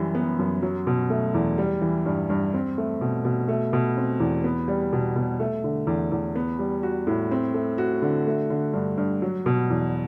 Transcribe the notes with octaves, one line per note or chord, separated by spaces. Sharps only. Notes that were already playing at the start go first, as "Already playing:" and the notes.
Already playing: F#2 E3 G3
B3
F#2
F#3
B2
A3
E2
G3
E3
G2
G2
C4
A3
B2
B2
A3
B2
C4
E2
B3
G3
B2
B2
A3
D3
E2
E2
B3
G3
F#4
A2
C4
A3
F#4
D3
A3
D3
G2
G2
F#3
B2
E2